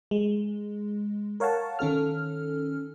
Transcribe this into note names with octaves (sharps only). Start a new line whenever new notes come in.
G#3
A#4 C#5 F5 F#5 A5
D#3 C#4 A4 F6